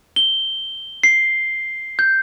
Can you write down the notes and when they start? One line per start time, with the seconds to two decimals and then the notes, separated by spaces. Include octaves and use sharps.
0.16 G7
1.04 C7
1.99 G6